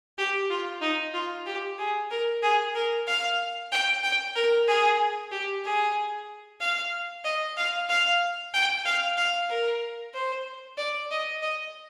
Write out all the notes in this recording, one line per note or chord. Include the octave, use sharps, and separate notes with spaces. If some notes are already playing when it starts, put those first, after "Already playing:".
G4
F4
D#4
F4
G4
G#4
A#4
G#4
A#4
F5
G5
G5
A#4
G#4
G4
G#4
F5
D#5
F5
F5
G5
F5
F5
A#4
C5
D5
D#5
D#5